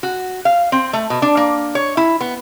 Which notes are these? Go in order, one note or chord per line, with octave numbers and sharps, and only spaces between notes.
F#4
F5
C4
A3
B2
D4
A#3
C#5
E4
B3